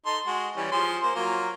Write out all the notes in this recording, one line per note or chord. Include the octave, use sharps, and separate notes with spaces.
D#4 A4 C6
G#3 F#4
E3 G3 C#4
F3 G#4 C6
A#3 C5
F#3 A#3 F4